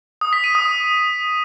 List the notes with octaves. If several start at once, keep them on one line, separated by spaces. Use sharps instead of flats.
D#6
B6
D#7
D#6